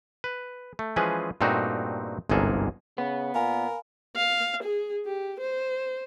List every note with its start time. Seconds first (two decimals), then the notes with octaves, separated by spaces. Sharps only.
0.24 B4
0.79 A3
0.96 E3 F3 G#3 C#4 G#4 B4
1.41 G2 A#2 A3 C4 D#4 F#4
2.30 G1 C2 G#2 A#3 G#4 A4
2.98 C#3 B3
3.35 A#2 A#4 F5 G#5 B5
4.16 F5
4.63 G#4
5.06 G4
5.40 C5